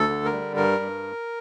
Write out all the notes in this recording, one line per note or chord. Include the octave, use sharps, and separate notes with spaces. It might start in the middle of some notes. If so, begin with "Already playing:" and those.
Already playing: D2 A4
D3
A#4
G3
G2 A#4
G2